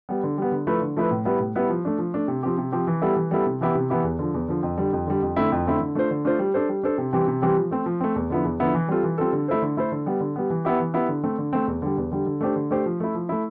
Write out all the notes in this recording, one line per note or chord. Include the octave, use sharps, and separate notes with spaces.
G3 B3
D3
G3 B3
D3
F3 A3 E4 B4
D3
F3 A3 E4 B4
A2
G3 B3 E4 B4
A2
G3 B3 E4 B4
F3
A3 D4
F3
A3 D4
C3
F3 C4 G4
C3
F3 C4 G4
E3
G3 B3 E4 A4
E3
G3 B3 E4 A4
C3
E3 B3 E4 G4
C3
E3 B3 E4 G4
E2
D3 F3
E2
D3 F3
F2
D3 G3
F2
D3 G3
F2
D3 A3 C4 E4
F2
D3 A3 C4 E4
D3
A3 D4 F4 C5
D3
A3 D4 F4 C5
G3
D4 A4 C5
G3
D4 A4 C5
C3
E3 G3 C4 G4
C3
E3 G3 C4 G4
F3
A3 C4
F3
A3 C4
E2
D3 F3 B3 E4
E2
D3 F3 B3 E4
E3
G3 C4 F4 A4
E3
G3 C4 F4 A4
D3
A3 E4 A4 C5
D3
A3 E4 A4 C5
D3
G3 B3
D3
G3 B3
E3
B3 E4 G4
E3
B3 E4 G4
D3
A3 C4
D3
A3 C4
E2
D3 G3
E2
D3 G3
D3
A3 D4 G4 C5
D3
A3 D4 G4 C5
F3
A3 E4
F3
A3 E4